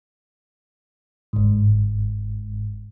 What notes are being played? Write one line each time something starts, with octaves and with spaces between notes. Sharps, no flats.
G1 G#2